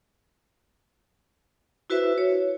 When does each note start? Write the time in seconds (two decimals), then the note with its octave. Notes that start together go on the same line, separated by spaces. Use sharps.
1.90 E4 F#4 B4 C5 E5
2.18 C#5